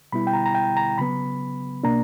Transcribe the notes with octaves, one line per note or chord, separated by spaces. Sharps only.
B2 G3 B3 E4 B5
G5
A#5
A#5
G5
A#5
C#3 F#3 B3 B5
B2 A#3 D4 A#5